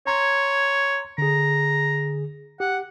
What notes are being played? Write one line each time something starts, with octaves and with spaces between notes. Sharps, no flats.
C#5 A#5 C6 G#6
D3 G#4 A#5
G4 F#5